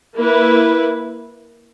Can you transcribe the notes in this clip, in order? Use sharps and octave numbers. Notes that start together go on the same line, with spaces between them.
A#3 E4 B4